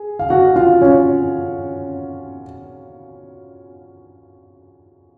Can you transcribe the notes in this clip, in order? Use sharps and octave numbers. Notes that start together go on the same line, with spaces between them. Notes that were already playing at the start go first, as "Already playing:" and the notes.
Already playing: G#4
F5
F#4 F#5
F4 F5
C#4 C#5